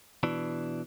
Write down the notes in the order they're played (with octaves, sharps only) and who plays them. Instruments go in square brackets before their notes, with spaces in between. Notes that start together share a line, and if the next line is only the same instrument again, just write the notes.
[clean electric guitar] B2 E3 D4